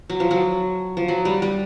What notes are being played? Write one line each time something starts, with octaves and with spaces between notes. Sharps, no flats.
F#3
F3
F#3
F3
F#3
G3
G3